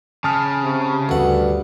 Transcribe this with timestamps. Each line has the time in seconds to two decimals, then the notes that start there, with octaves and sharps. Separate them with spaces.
0.24 C#3 A5 D#6 F6
0.63 C3
1.09 D2 G2 F#5